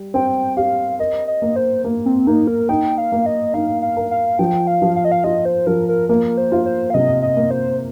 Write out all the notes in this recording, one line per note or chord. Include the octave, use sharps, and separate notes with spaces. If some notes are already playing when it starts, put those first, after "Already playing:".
Already playing: G3
C4 G5
G4 F5
A#4 D#5
D#5
A#3
C5
A#3
C4
A#3 D#4
A#4
D#4 G5
F5
A#3
D#5
D#4 F5
F5
A#4
F5
F3 G5
F5
F3
F5
D#5
F5
F4 D#5
C5
F3 A#4
A#4
A#3 A#4
C5
F4
C5
F5
C3 D#5
D#5
A#3
C5